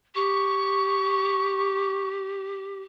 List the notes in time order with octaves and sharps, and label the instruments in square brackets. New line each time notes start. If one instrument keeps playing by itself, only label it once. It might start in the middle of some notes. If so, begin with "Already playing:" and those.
[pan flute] G4 [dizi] C#6